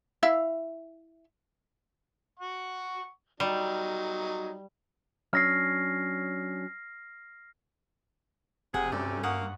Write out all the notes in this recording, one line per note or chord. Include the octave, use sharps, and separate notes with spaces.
E4 E5 F5
F#5 C#6
F#3 G3 D#4
F#3 C#4 D4 F6 A#6 C7
F1 C3 G#4 F#5
D2 G2 A3 C#4 D5
A#3 F#5 C#6 D#6